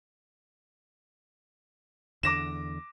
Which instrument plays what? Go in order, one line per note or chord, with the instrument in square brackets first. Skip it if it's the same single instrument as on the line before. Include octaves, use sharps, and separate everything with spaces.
[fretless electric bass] E2 D3 [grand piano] D6 A#6 E7